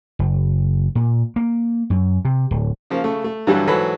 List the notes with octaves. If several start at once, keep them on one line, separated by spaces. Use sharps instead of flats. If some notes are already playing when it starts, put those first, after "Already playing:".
F#1
A#2
A#3
F#2
C3
D1
C#3 F3 A#3
C#3 A3
A3
G2 D3 E3 F#3 G3
G#2 E3 F#3 A4 B4